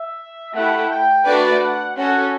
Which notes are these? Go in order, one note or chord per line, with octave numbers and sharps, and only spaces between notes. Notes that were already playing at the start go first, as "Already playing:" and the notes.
Already playing: E5
A3 E4 G4 F#5
G5
A3 D4 F#4 B4 D5
F#5
C#4 F#4 A4 F#5